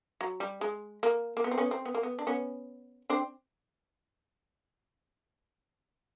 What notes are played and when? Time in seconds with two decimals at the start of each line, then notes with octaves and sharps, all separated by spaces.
0.21 F#3
0.40 G3
0.61 G#3
1.03 A#3
1.37 A#3
1.44 B3
1.51 C4
1.58 B3 C#4
1.71 C4
1.85 B3
1.94 A#3
2.03 B3
2.19 D4
2.27 B3 C#4
3.10 C4 D4